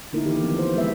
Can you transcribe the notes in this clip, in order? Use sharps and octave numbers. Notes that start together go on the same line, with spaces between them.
D3 A3 A#3 D#4 E4 A#4
D#3 E3 G4
E3 F3 B3 C4
C5
G#3 A3 B3 B4 E5